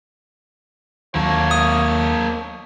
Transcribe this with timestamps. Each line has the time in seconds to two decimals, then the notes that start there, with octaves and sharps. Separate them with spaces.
1.15 D#2 F#3 A#3 A4 C#5
1.51 D#6